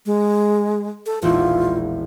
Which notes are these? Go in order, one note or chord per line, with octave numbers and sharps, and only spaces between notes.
G#3
A4
E1 A#1 E4 F4